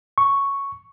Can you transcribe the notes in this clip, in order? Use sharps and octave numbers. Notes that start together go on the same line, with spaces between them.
C#6